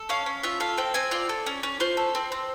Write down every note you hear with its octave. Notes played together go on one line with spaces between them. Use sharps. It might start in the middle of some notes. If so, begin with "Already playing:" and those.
Already playing: A4
C#4 F5
C#4
F4 E5
A4 F5
C4 G5
C4 G#5
F4 D5
A4
C#4
C#4
F4 C5
A4
C4
C4